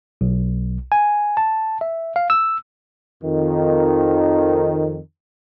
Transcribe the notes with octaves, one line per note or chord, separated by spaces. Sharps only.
B1
G#5
A5
E5
F5
E6
F2 D#3